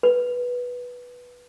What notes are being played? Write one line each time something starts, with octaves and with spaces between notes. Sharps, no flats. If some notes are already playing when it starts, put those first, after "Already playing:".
B4